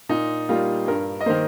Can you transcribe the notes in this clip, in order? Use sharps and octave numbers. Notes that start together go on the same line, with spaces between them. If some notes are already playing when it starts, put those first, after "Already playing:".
A#2 D#4
G3 A#3 F4
G2 A#4
D#5
D#3 A#3 C5